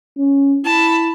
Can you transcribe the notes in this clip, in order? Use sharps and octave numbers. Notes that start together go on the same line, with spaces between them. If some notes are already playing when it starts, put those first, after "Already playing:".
C#4
E4 A5 B5